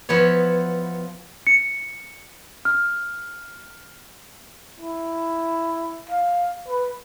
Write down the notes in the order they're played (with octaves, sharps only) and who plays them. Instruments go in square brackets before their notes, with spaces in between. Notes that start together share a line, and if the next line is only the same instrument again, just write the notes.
[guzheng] F3 B3 E4 C#5
[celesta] C#7
F6
[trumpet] E4
F5
B4